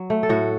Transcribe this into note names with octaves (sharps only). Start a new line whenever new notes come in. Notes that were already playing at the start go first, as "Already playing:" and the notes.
Already playing: F#3
A3
A4
A2 F#4